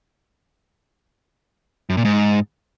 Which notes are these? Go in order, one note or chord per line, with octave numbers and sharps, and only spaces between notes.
F#2
A#2
G#2